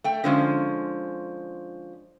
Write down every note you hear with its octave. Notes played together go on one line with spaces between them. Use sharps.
A3 G5
D3 F3 G#3 C#4